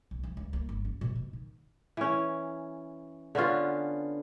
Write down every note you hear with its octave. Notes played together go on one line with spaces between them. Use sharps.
B1
F3
C#2
A#3
G1
C#4
B2
B2
D#3
E3 C#4
D3 B3 C#4 F4